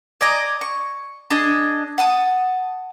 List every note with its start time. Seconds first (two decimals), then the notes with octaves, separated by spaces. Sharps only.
0.21 D5 D#5 G#5 A#5
0.61 C#6
1.30 D4 G#4 D#5 G#5
1.98 F#5 A5 D#6